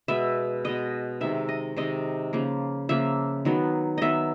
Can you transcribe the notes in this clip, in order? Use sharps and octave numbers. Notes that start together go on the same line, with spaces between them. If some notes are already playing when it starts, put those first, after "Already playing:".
B2 G#3 B3 E5
B2 G#3 B3 D#5
C3 D#3 G#3 E5
D#5
C3 D#3 G#3 D#5
C#3 F3 A#3
C#3 F3 A#3 E5
D#3 F#3 B3
D#3 F#3 B3 D#5 E5